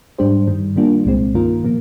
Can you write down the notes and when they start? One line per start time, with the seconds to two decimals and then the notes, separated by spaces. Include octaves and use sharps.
0.18 G#2 G3 D4 G4 C5
0.47 G2 D#3 G3
0.76 D#3 G3 A#3 D4 F4
1.06 C2 A#2 G#3 C4
1.35 G2 D#3 A#3 F4 A#4
1.64 A#2 F3 A#3